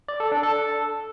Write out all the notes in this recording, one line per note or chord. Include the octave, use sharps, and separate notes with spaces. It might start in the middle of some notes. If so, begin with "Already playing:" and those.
D5
A4
D4
A4